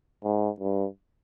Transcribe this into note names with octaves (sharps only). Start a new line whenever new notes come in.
G#2
G2